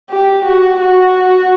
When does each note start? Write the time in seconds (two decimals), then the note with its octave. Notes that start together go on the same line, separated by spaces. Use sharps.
0.10 G4
0.45 F#4
0.81 F#4